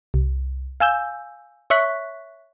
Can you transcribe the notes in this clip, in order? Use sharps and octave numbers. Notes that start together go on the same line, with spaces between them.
C2
F5 G#5 E6 G6
C#5 E5 C#6 F#6 B6